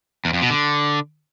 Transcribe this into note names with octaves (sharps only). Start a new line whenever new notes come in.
E2
F2
B2
D3